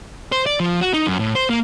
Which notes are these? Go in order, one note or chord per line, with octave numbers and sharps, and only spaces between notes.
C5
D5
F3
F#4
D#4
F#2
A2
C5
A#3